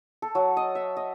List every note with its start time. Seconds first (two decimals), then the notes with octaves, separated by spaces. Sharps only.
0.22 A4
0.35 F#3
0.57 D#5
0.75 E5
0.97 D#5